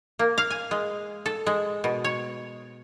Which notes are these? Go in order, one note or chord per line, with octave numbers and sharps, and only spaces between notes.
A#3
F5
G#5
G#3
A4
G#3
B2
C#5